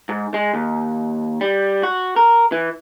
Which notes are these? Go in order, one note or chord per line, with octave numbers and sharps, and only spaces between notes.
G#2
G#3
D#2
G3
F#4
A#4
E3